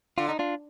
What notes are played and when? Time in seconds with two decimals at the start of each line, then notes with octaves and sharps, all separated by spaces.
0.18 D3 F4
0.29 D#4
0.39 D4 F4